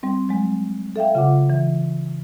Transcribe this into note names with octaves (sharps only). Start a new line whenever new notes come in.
G3 C4
F#3 G#3 C4
A4 E5 F5 G5
C#3 F4 F#5 D6
E3